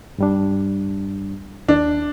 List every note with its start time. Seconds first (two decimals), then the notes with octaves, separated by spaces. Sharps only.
0.18 G2 G3 D4
1.68 D#2 D4